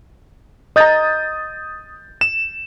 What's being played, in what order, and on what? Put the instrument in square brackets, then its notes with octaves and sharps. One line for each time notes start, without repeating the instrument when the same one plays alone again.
[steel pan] D#5 A#5 [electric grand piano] D#6 G6 A6
[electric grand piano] E7